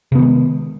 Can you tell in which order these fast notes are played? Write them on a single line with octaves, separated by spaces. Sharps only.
C3 B3 D#3 G#3